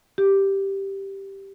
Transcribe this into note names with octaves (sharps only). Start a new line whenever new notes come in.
G4